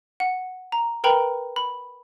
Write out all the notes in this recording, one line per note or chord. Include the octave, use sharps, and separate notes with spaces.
F#5
A#5
A#4 B4 G5 A#5 B5
B5